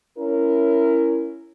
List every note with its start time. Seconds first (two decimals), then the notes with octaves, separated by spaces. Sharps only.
0.18 C#4 E4 A#4